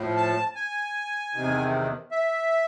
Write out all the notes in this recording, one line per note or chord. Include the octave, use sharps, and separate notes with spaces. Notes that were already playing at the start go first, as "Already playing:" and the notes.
Already playing: A2 F3
A5
G#5
E2 C3 D#3
E5